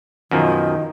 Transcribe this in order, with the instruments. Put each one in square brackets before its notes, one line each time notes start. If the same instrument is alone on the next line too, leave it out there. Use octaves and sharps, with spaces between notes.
[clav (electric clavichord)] F#2 B2 F3 [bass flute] D#3